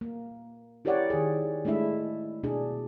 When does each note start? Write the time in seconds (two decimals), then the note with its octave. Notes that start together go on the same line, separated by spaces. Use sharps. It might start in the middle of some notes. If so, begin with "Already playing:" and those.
0.01 A#3
0.85 E4 G4 A#4 C#5 D5 F#5
1.10 D#3 G#4
1.65 G#3 A3 D4 E4 E5
2.43 B2 D4 G#4